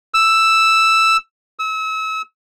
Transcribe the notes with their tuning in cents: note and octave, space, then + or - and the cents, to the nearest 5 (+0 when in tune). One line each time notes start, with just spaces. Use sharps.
E6 +5
E6 -35